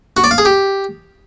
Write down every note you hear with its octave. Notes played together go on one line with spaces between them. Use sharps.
F#4
D5
F5
G#4
G4